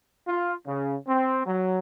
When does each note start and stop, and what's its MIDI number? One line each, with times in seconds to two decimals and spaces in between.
0.28 0.53 65
0.66 0.95 49
1.07 1.41 60
1.46 1.79 54